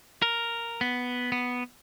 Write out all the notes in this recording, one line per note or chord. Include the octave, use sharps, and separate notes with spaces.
A#4
B3
B3